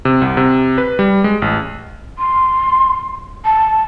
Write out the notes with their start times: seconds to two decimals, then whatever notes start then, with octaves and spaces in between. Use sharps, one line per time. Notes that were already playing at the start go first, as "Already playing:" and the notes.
0.05 C3
0.22 C2
0.37 C3
0.78 B4
0.99 G3
1.24 G#3
1.42 A1
2.18 C6
3.45 A5